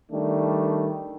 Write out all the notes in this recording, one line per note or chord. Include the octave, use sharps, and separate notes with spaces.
D#3 G3 A3 D4